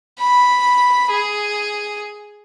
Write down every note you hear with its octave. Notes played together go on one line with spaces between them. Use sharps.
B5
G#4